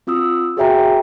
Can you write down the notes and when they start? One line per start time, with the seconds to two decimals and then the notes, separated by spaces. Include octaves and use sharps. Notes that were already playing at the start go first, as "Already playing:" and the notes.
0.07 C4 F4 D#6 E6
0.57 F#4 G#4 C#5 E5 G5 A#5